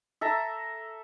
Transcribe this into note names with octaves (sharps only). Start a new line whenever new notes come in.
A4 E5 A#5